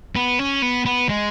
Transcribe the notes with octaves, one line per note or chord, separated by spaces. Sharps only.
B3
C#4
B3
B3
G#3